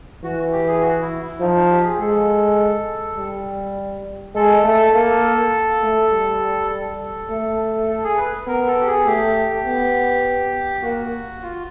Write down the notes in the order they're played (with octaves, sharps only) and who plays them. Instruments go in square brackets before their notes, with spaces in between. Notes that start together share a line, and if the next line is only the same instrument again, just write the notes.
[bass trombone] E3 [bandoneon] F#4
[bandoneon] G4
G#4
F#4
E4
E4
[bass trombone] F3 [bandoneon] D#4
[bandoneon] D#4
G4
G#4
[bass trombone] G#3 [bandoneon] A4
[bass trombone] G3
[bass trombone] G#3 [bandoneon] A4
[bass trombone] A3
A#3
A3
G3
[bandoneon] A4
[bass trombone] A3
[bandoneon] A4
G#4
B4
[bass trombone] B3 [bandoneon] A#4
[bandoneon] A4
G4
G#4
[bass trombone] A3 [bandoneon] G4
[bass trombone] B3
[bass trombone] A#3 [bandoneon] F#4
[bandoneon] F4